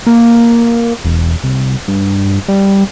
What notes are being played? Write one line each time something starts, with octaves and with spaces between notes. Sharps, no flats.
A#3
E1
C2
G2
G3